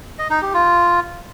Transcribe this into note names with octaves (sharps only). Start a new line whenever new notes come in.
D#5
D#4
G4
F4